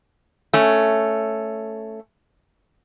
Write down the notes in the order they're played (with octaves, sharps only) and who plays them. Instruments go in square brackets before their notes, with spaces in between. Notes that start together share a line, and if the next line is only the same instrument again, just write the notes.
[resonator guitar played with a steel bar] A3 C#4